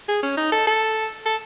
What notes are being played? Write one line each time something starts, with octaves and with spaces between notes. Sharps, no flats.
G#4
C#4
D#4
A4
A4
A4